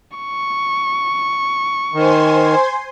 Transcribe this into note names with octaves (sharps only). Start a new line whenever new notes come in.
C#6
D#3 C5 G#5 C6